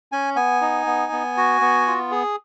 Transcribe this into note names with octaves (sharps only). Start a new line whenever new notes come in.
C#4 G#5
B3 G#5
D#4
B3
B3
F#4
B3
F4
G#4